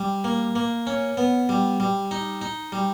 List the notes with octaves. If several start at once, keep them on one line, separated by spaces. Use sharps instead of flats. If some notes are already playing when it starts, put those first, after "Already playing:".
Already playing: G3
A#3
A#3
C#4
B3
G3
G3
D#4
D#4
G3